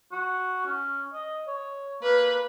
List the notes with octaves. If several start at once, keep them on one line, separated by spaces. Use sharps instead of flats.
F#4
C#4
D#5
C#5
A#3 B4